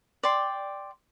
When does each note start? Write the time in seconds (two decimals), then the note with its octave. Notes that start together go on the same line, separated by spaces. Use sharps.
0.23 D5 G5 C6